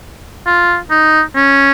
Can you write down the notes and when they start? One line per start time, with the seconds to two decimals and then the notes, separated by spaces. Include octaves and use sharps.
0.47 F4
0.91 D#4
1.35 C#4